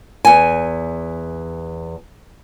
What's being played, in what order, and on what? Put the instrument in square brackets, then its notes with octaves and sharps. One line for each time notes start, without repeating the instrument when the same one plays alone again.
[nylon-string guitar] E2 G#5